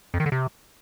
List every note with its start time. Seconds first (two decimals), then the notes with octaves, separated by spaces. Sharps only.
0.14 F2
0.20 D#3
0.26 D3
0.32 C3